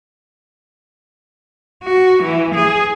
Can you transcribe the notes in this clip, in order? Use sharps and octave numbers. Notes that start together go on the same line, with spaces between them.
F#4
E3
G#4